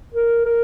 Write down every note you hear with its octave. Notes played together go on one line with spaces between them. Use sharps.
A#4
A#4